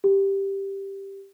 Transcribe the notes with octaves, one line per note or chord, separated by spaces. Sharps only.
G4